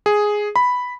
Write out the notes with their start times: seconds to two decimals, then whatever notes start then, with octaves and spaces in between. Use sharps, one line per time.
0.06 G#4
0.56 B5